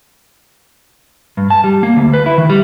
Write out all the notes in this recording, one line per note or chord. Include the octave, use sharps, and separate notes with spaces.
G2
A5
G3
A#3
D2
B4
E4
D#3
G3